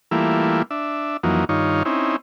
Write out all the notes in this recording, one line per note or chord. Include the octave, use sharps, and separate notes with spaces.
E3 G3 A3 A#3 E4 F4
D4 E5
F2 E3 F#3 A#3 D#4
G2 D#3 D#4 F4 C#5
C4 C#4 D#4 E4